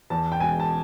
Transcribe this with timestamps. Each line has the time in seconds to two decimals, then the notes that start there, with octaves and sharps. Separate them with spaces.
0.10 E2 A5
0.32 G5
0.40 E1 G#5
0.60 A5